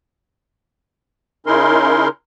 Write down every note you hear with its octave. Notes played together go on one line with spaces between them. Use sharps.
C#3 C#4 D#4 E4 A#4 C6